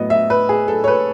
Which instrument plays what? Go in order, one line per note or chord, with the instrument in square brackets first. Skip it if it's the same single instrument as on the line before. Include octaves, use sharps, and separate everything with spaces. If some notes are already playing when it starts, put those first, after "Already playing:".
Already playing: [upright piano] A2 F#3 B3 D#5
E5
B4
G#4
A4
C#5
B4